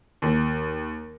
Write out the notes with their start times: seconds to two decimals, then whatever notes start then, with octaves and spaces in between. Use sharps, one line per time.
0.22 D#2